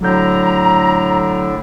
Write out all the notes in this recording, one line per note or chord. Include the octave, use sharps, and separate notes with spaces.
A2 D3 F#3 A#5 G6